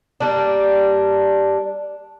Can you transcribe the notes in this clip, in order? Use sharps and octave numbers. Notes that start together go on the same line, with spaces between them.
G3 A#3 D4